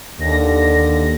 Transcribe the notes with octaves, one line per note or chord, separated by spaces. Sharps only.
D#2 D3 A#6